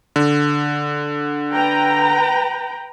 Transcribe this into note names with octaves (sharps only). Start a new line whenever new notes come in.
D3
B4 G5 A#5